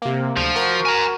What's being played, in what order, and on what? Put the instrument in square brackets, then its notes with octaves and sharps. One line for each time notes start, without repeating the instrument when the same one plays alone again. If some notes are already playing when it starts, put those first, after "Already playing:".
[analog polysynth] C3 A#3
[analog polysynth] D2 [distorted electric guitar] F3
[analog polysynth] F#4 A#4
[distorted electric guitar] G#5 A#5